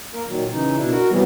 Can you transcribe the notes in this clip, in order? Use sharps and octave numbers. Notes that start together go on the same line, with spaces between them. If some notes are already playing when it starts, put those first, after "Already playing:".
A#3 A#4
A#2 D#3 F#3
C#3 E3 D#4
B2 D4 E4
F#4 A#4
C3 E3 F#3 G3 B3